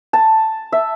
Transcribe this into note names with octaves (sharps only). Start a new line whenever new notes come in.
A5
E5